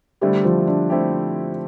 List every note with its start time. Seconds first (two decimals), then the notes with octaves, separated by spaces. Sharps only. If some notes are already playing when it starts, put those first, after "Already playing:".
0.21 D3 G3 A3 C4 E4 G4
0.44 F3
0.67 D4
0.90 D3 A3 C4 E4 G4